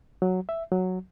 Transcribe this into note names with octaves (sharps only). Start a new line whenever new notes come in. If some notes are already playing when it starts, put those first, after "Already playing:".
F#3
E5
F#3